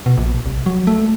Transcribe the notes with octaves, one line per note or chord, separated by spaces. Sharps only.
B2
A#1
C2
F#3
A3